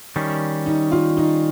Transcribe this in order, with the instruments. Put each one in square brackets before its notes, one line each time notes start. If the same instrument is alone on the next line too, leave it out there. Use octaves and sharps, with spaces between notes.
[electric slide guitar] D#3 G3 C#4
[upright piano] D#4
F4
D#4